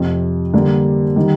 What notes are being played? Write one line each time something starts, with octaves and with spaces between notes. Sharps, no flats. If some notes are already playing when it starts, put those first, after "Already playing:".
Already playing: F2 C3 F3
D3 G3 A#3 D4
D#3 G3